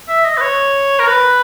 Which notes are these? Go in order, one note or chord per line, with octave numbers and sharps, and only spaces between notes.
E5
D#5
B4
C#5
A#4
B4